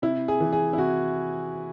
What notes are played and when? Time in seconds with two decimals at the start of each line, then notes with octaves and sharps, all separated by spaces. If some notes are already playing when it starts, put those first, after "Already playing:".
0.02 C3 E4
0.28 G#4
0.40 E3
0.53 G#4
0.73 E4
0.78 C3 F#4